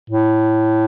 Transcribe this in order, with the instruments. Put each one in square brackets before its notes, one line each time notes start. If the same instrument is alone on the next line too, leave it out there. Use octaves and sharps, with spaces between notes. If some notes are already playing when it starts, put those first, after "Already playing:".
[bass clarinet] A2